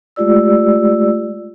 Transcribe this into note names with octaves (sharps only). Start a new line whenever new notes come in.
G#3 A3 F4 G4 D5 E6